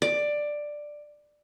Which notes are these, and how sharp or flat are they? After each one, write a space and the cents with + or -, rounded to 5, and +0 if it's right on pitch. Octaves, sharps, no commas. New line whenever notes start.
D5 +10